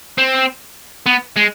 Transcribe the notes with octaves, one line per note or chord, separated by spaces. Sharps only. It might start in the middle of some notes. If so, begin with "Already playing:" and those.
C4
B3
G#3